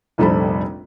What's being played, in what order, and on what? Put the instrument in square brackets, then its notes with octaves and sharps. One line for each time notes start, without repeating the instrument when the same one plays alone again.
[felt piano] F1 A#1 G3 A4 C5 B5